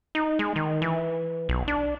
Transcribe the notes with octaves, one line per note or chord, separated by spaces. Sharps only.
D#4
G#3
D#3
E3
B1
D4